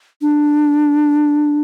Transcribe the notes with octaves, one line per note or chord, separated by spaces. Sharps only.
D4